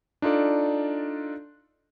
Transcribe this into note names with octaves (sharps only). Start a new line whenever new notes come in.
D4 D#4 F4 A4 D5